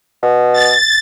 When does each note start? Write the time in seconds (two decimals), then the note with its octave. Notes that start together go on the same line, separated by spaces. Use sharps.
0.23 B2
0.53 A6